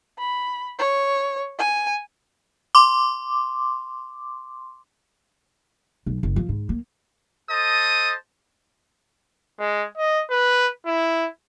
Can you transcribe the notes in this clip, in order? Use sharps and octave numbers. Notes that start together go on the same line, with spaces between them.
B5
C#5
G#5
C6 D6
B1
F#1
F3
G#2
A#3
A4 C5 D#5 A5 D#6
G#3
D#5
B4
E4